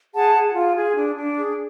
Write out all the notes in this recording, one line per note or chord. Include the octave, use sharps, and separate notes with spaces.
G#4 F#5 A5
G#4
F4
G#4
D4
D4
G#4